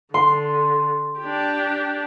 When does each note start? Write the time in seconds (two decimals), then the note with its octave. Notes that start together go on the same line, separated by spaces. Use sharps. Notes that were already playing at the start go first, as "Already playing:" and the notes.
0.14 D3 C6
1.20 D4 G4